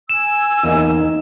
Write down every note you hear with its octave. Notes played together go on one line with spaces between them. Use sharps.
G#5 E6 E7
E2 A#3 D#4